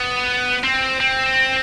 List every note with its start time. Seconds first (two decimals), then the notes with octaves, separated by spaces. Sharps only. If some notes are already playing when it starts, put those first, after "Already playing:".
Already playing: B3
0.64 C4
1.00 C4